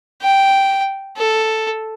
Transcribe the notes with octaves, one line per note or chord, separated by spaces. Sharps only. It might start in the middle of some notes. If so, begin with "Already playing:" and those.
G5
A4